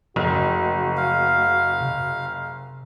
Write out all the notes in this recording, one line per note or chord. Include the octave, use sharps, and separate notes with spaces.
F#1 F3 A3 A#3 F#4
F5
C3